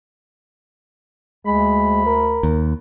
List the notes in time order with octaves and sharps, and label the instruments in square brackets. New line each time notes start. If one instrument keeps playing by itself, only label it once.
[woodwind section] D2 B5 [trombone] G#3
[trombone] A#4
[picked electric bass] D#2